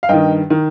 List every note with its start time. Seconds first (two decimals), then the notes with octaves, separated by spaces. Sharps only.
0.03 F5
0.09 G2 D#3 D#5 G5
0.50 D#3